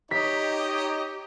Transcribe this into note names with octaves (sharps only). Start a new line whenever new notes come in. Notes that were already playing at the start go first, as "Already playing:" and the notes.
D#4 G4 C#5 D#5 B6